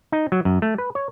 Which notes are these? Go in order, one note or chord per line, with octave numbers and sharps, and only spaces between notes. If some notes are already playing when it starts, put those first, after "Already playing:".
D#4
F#3
F#2
A3
B4
C#5